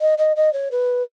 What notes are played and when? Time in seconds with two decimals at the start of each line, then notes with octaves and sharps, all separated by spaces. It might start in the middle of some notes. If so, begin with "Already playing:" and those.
0.01 D#5
0.18 D#5
0.36 D#5
0.53 C#5
0.71 B4